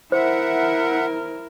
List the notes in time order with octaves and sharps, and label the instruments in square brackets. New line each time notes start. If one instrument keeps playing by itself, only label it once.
[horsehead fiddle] E4 A#4 [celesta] C5 [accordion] E5 F#5